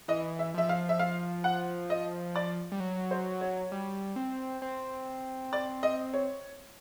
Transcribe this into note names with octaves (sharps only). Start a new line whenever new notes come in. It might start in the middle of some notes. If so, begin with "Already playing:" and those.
E3 D#5
E5
F3 E5
F5
E5
F5
F#5
D#5
D5
G3
F#3
C5
C#5
G3
C4
C4
D5
D#5
C#5